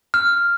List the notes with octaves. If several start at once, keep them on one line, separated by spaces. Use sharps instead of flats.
F6